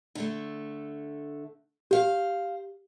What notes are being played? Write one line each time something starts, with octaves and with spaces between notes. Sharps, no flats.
D3 A3
G4 C5 F5